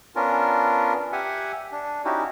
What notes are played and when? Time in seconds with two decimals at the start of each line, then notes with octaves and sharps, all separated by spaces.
0.16 B3 C#4 D4 F4 A#4
1.12 G4 E5 F#5 G#5
1.72 D4
2.05 C#4 D#4 E4 F#4 G4